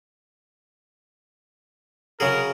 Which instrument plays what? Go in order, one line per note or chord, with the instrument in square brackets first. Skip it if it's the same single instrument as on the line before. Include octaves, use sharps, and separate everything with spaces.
[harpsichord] C#3 F#3 G#4 [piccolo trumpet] A#4